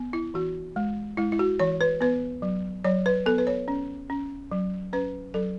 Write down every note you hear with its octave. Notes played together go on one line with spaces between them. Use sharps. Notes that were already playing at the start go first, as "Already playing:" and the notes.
Already playing: B3
E4
E3 F#4
G#3
G#3 E4
E4
F#4
E3 C#5
B4
B3 B4
F#3
F#3 C#5
B4
B3 A4
B4
C#5
C#4
C#4
F#3
C#4 B4
F#3 A4